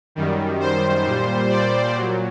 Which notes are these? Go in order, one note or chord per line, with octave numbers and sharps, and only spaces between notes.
F#2 D#3 G3
C5
A#2 G3
D5
A#2 F#3